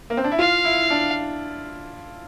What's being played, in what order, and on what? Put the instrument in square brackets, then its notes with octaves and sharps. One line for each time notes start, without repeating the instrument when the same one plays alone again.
[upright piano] A#3
C4
D4
E4
[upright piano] F4 [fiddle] F5
[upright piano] E4
D4